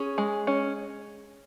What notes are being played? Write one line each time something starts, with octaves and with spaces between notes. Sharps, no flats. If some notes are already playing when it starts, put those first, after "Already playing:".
Already playing: C#4 G#4
G#3
C#4